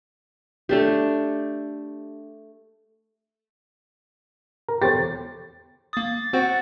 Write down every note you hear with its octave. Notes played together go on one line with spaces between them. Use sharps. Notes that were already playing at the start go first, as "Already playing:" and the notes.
A3 D4 G4
A#4
E1 G4 A4 C5 C#5 A6
A#3 D#6 A6
C4 F#4 C5 F#5